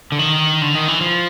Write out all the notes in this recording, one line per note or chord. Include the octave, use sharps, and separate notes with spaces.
D3
D#3
D3
D#3
E3
F3